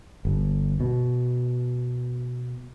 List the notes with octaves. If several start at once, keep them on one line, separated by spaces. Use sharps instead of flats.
G1
B2